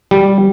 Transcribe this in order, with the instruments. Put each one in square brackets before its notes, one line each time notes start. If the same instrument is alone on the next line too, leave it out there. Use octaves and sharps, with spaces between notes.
[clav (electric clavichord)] G3